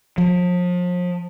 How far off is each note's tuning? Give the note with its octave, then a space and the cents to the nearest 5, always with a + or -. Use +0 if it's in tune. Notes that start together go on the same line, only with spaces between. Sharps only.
F3 +35